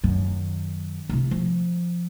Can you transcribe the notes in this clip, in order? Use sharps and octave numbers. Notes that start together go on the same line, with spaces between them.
F#2 D#3
C3 E4
F3